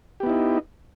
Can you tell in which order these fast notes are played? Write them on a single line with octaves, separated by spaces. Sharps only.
G4 B3 E4 D#4